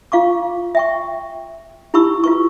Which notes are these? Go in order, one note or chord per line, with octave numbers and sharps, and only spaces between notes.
F4 F5 C#6 D6
E5 G5 C#6
D#4 E4 G4 B5 C#6 E6
F4 B4 C#6